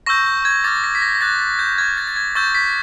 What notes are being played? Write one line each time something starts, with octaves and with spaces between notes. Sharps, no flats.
C#6 E6 G6 A#6
G6
G#6
D6 F6 A6
A#6
B6
A#6
A#6
D6 F#6 A6
A6
G6
C#6 F6 G#6
A6
A6
G#6
C#6 E6 G6 A6
B6